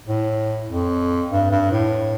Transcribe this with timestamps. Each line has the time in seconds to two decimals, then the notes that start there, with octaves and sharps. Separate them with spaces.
0.08 A2
0.69 F2
1.30 G2
1.51 G2
1.71 A2